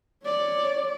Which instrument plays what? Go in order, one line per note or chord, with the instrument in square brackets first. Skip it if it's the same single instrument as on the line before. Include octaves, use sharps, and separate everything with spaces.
[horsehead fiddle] C#5 D5